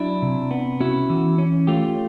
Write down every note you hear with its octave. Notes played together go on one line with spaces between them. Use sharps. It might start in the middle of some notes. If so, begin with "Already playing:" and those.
Already playing: F#3 D4 E4
C3
B3
C#4 E4 F#4
E3
C#4
A3 F4 G4